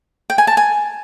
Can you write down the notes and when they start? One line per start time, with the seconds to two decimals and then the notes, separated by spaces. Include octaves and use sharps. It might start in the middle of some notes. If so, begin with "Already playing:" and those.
0.30 G5
0.38 G#5
0.47 A5
0.57 G#5